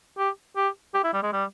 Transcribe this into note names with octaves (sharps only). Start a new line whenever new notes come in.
G4
G4
G4
E4
G3
G#3
G3